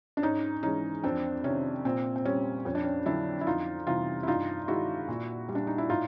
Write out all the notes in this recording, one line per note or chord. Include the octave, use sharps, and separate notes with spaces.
D4
G#2 C#4 D#4
E3 G#3 C#4 D#4
F2 C4 D4
C3 D#3 C#4
A#2 C4
C4
G3 C#4
F2 C#4
D4
C#4
D3 F#3 D4 E4
E4
F2 D#4 F4
C3 E3 G3 D#4 F4
E4
G2 D#4 F4
D#3 G#3 E4 F#4
A#2
G3
D4
D#4
E4
A2 D#4 F4